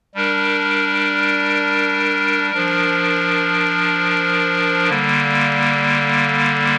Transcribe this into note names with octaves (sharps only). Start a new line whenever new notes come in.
G3 D4 A#4
F3 D4 A#4
D3 G3 A#3